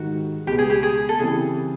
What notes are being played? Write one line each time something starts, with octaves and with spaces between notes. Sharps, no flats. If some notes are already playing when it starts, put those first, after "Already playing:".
Already playing: G#2 D#3 G3 F#4
C#2 B2 G#3 B3 G4
G#4
G4
G#4
A4
C#3 E3 G3 C4 G#4